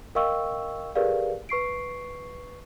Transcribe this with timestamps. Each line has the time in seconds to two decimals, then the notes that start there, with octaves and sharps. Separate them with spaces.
0.15 A#4 D#5 F5 G5 C#6 E6
0.95 G4 G#4 A#4 B4 D5 F5
1.49 B4 C#6 C7 D7